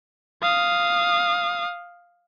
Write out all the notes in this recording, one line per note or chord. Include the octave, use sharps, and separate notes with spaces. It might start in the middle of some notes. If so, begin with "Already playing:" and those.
F5 D#6